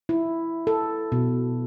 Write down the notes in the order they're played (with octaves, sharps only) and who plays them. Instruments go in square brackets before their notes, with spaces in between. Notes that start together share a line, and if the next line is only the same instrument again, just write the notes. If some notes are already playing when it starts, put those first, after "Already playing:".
[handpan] E4
A4
B2